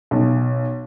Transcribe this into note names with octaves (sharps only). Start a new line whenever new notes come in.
B1